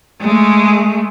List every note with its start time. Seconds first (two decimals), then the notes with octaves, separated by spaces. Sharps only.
0.21 G#3 A3